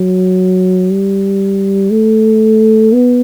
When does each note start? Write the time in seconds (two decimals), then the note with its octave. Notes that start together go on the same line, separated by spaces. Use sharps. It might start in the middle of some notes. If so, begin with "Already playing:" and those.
Already playing: F#3
0.91 G3
1.91 A3
2.93 B3